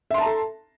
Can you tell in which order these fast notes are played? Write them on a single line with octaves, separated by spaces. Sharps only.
E5 C6 A5 A#5 A4